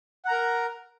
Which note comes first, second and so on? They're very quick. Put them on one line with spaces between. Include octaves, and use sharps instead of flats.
F#5 A#5 A#4